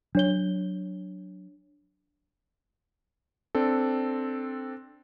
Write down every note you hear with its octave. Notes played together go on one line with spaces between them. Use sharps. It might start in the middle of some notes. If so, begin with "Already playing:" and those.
F#3 D4 C#5 G7
C4 D4 A4